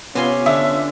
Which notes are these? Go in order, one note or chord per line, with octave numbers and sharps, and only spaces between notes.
C3 B3 C#4 F4 G#5 C6
D3 E5